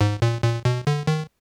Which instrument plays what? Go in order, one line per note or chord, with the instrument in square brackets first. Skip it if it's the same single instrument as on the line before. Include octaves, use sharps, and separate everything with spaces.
[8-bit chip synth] G#2
A#2
A#2
B2
D3
D#3